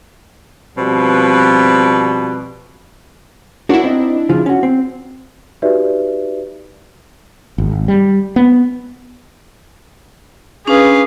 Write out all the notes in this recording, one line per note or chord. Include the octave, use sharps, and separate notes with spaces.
B2 F3 G3 C4 B4
D4 E4 F#4 A#4 C#5
C4 D#4 D#5
C#3 F3 F4
C#4 F#4
C4
D#4 F#4 G4 B4 D5 E5
G#1
G3
B3
C#4 D4 G#4 B4 F5